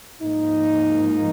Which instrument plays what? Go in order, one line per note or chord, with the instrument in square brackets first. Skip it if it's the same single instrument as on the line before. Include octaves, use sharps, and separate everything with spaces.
[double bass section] G#2 F3 A#3 [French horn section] D#4